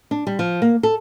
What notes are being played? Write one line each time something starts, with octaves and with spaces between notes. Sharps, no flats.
D4
G3
F3
A#3
A4